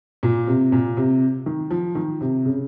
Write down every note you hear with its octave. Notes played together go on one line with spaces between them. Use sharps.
A#2
C3
A#2
C3
D#3
F3
D#3
C3
C#3